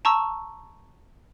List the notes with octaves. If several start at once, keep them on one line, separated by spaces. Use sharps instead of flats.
A5 A#5 C#6 E6